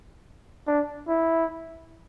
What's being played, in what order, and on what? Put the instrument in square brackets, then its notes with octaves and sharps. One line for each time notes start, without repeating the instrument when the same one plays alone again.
[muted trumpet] D4
E4